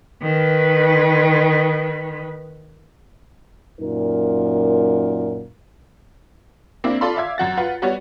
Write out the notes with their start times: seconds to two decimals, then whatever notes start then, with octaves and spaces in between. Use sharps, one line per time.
0.22 D#3 B4
3.79 F#2 A#2 D#4 A#4
6.84 A#3 C4 D4 E4
7.01 F4 A4 D5 F5 B5 C6
7.17 E5 F5 D6 G#6
7.38 F#2 F#4 A6
7.57 F4 B4 F#5
7.82 G3 B3 F#4 C#5